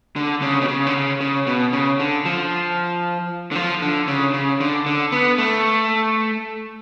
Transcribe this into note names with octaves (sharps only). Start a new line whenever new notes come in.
D3
C#3
B2
C#3
D3
C#3
C#3
B2
C#3
D3
F3
D3
F3
D3
C#3
C#3
D3
D3
B3
A3